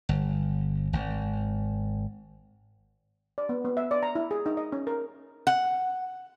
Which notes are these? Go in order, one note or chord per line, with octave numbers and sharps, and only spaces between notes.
G1
G#1
D5
B3
B3
E5
D5
A#5
E4
G#4
D#4
D#5
C#4
A#4
F#5